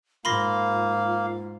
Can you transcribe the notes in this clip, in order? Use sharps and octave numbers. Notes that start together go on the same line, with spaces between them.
G#2 A#3 F4 F5 B5 C6 A#6